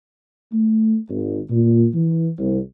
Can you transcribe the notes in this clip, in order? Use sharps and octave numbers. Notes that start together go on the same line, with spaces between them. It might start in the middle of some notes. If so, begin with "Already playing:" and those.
A3
G#1
A#2
E3
C2